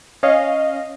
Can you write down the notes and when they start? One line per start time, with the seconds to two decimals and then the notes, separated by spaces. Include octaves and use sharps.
0.23 C#4 D#5 F5